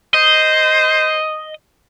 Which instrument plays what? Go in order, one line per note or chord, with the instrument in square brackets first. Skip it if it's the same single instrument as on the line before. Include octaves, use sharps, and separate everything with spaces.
[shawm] C5 [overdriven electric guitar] D#5